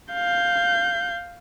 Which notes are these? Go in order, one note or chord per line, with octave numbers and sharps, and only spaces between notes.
F5 G6